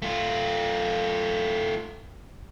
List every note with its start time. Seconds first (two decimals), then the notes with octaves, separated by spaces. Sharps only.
0.02 A3 F4